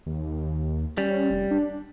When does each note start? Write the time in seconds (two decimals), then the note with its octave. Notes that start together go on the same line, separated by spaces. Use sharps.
0.06 D#2
0.98 G3 C#4
1.30 F1
1.51 D4